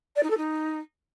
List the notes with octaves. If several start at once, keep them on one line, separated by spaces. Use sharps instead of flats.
D5
D#4
A4
D#4